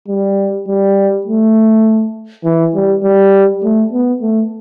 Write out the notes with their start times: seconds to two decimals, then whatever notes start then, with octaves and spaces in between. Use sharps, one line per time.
0.08 G3
0.68 G3
1.26 A3
2.44 E3
2.74 G3
3.03 G3
3.63 A3
3.93 B3
4.22 A3